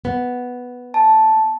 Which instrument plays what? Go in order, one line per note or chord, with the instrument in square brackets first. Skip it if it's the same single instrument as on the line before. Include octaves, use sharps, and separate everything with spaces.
[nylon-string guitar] B3
[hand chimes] A5